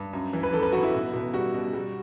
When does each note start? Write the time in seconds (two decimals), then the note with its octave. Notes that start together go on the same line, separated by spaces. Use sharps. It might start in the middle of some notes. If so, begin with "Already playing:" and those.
Already playing: G2
0.13 F#2
0.33 E3
0.43 B4
0.52 E3 A4
0.63 B4
0.73 E3 F#4
0.83 E4
0.93 B2
1.13 B2
1.34 G3 F#4
1.54 B2
1.73 G3